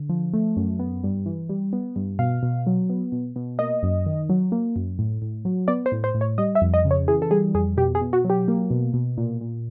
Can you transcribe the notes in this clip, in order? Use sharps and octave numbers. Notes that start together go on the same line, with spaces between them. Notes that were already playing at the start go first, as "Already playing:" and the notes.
Already playing: D3
F3
A3
F#2
B3
G2
E3
G3
B3
G2
B2 F5
B2
F#3
B3
B2
B2
A#3 D#5
F#2
D#3
F#3
A#3
F#2
A2
A2
F#3
B3 D5
C5
A2
C5
A2
C#5
G3 D#5
E5
F2
D#5
C#3
C#5
E3 G#4
A4
G3 G#4
F2 G#4
B2 G4
G#4
B2
F#4
F#3
G4
A#3
B2
B2
A#2
A#2